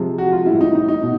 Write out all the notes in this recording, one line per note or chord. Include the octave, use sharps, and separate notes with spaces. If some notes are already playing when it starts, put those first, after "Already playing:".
Already playing: C3 F3 G#3
F#4
F4
A2 E3 G3 E4
D#4
D#4
D#4
B2